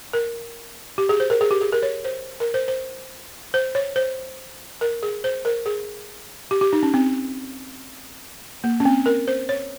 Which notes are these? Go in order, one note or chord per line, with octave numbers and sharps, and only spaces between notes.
A#4
G4
G#4
C5
A#4
G#4
G4
G#4
A#4
C#5
C5
A#4
C5
C5
C5
C#5
C5
A#4
G#4
C5
A#4
G#4
G4
G4
D#4
C#4
C4
A#3
C#4
C4
A#4
C5
C#5